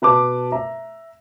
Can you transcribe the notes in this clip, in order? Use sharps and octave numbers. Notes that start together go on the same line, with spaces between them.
B2 B4 A5 D6
E5 A#5